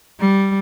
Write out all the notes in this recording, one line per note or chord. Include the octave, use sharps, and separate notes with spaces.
G3